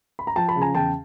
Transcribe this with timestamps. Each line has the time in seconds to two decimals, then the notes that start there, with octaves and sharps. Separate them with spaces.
0.19 B5
0.27 A#5
0.36 F3 G5 A5
0.49 A5 B5
0.56 C#3
0.61 G#5 A#5
0.75 E2 G5 A5